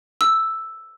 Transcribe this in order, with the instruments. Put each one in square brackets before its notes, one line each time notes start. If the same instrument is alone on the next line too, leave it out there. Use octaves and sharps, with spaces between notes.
[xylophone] E6